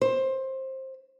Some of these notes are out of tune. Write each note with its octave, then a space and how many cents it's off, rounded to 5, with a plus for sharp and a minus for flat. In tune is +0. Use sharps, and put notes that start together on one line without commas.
C5 +20